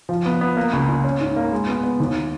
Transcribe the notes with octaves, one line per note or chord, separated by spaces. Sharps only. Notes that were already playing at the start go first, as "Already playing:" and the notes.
F3
B3
B3
A#3
C#2
C#2
C#4
G#2
A#3
G#3
B3
B3
D#2